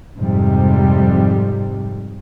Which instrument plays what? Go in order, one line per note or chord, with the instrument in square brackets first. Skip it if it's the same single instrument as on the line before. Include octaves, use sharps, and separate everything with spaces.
[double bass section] F2 G#2 C3 G3